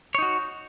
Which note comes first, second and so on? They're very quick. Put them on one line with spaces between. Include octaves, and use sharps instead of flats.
C#5 D#4 F#4